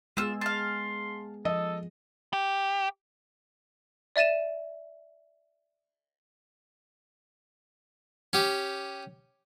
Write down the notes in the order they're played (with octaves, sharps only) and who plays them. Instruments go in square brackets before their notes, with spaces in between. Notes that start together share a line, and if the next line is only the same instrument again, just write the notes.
[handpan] G#3 B3 G#4 [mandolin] F4 E6
[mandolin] F5 A5 [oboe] C6
[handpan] F3 [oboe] A4 [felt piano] D#5
[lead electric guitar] G4
[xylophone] D5 E5 A6 D#7 E7
[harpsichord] C#4 G4